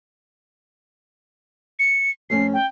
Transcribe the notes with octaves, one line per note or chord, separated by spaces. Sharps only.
C#7
F2 A3 C#4 C7
G5